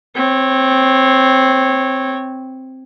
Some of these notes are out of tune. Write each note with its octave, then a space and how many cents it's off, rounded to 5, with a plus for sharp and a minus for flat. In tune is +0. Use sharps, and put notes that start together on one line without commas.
C4 +0 C#5 -15